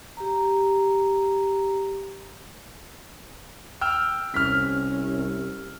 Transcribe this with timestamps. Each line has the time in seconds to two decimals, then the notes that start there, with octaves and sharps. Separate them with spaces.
0.17 G4 A#5
3.81 G5 E6 F6
4.34 C2 C#4 F6 B6